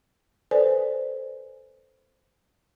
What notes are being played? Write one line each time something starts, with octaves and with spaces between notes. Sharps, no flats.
A4 B4 C5 D5 G#5